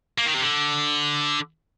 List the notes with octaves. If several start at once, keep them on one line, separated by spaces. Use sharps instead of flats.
A#3
D#3
C3
D3